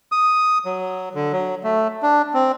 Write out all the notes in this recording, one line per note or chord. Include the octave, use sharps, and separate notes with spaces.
D#6
F#3
D3
F#3
A3
D4
C4